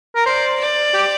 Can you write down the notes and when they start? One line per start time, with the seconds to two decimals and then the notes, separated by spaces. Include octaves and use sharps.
0.16 A#4
0.26 C5 D5
0.59 D5
0.94 G4